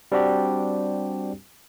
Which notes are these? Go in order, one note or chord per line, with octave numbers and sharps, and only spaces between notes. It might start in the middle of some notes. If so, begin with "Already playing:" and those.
G3 C4 D4 F#4 G4